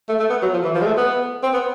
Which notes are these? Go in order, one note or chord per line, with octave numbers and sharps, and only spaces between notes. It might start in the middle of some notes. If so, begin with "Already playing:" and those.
A3
A3
B3
F#3
F3
E3
F3
G#3
A3
B3
C4
B3